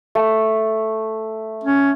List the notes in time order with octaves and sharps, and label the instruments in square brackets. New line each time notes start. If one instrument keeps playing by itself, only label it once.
[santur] A3
[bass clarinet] C#4